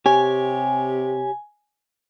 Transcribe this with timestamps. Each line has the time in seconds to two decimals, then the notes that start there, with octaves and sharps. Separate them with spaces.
0.06 C3 G4 C#5 G#5